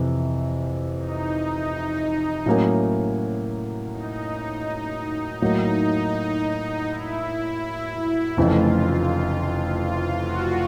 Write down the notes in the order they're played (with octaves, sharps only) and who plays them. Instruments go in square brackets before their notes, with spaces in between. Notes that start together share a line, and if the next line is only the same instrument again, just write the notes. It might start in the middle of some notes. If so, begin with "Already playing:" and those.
Already playing: [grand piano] F2 C3 E3
[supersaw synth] D#4
[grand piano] A2 F#3 A#3 C#4
[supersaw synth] D#4
[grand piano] A2 F#3 A#3 [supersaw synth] D#4
[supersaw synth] E4
[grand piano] F1 F2 C#3 E3 A3 [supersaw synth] F4
[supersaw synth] F4
F#4